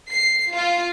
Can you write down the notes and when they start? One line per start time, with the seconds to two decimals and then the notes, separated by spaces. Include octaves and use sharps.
0.10 C7
0.55 F4